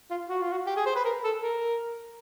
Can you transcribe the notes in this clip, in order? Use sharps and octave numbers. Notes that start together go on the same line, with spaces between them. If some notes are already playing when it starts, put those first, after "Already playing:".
F4
F#4
F4
F#4
G4
G#4
C5
B4
A#4
A4
A#4